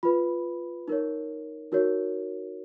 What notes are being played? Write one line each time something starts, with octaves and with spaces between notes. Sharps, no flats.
F4 B4 B5
D#4 A#4 C#5
D#4 F#4 A#4 C#5